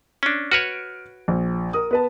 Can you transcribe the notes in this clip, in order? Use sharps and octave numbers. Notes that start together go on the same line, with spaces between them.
C#4 D4
F#4 B4 C#5 F6 D7
A#1
A#4 D#6
B3 B4 A5